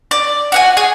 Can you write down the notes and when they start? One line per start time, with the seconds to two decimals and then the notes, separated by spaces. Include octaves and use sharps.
0.11 D5
0.52 F#4 F#5 G#5
0.77 G#4 G#5